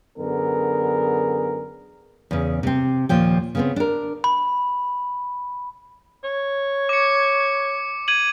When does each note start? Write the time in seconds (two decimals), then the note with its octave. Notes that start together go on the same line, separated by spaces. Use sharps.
0.18 F#2 D3 B3 G#4 A#4
2.31 E2 C#3
2.63 C3 C4
3.09 D#2 A#2 F3 G5
3.55 C#3 B3 C4
3.76 D4 A#4
4.24 B5
6.24 C#5
6.89 D6 C#7
8.08 G#6 D#7 F#7